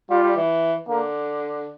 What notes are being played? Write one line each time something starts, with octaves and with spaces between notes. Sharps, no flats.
G3 F4
G3
E3
D3 A#3